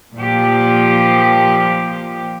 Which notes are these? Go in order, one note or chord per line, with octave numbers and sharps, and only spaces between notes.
A#2 F3 G4